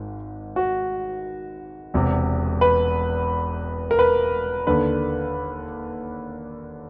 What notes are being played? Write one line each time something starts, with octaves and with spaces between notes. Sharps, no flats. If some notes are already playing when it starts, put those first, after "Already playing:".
Already playing: G#1 G#2
F#4
E1 E2 C3
B4
A#4
B4
D#2 D3 B4